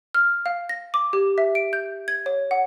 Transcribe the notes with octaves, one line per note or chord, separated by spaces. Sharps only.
F6
F5
A#6
D6
G4
E5
D7
G6
G#6
C#5
F#5